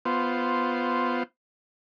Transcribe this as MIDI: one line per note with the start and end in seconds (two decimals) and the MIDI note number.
0.05 1.23 59
0.05 1.23 65
0.05 1.23 72